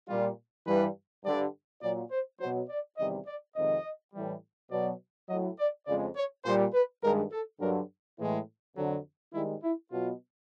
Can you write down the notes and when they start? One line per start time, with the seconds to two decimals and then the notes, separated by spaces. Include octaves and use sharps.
0.09 A#2 G3 F4
0.67 G2 E3 G3 B4
1.24 G2 D3 G3 D5
1.82 A#2 F#3 D5
2.11 C5
2.40 F#3 C5
2.45 B2
2.69 D5
2.98 E2 C3 D#3 G3 D#5
3.27 D5
3.56 F2 C3 D#3 G#3 D#5
4.14 A2 E3 G3
4.71 B2 F#3 D5
5.29 A2 F#3 D#5
5.59 D5
5.87 F2 C#3 F3 G#3 D5
6.16 C#5
6.45 A#2 G3 C5
6.74 B4
7.03 G2 D#3 G#3 A#4
7.32 A4
7.60 G2 D3 F#3 A#4
8.19 A2 E3 G#3
8.77 F2 D3 F#3
9.33 G#2 D#3 G3 E4
9.63 E4
9.92 B2 F#3 F4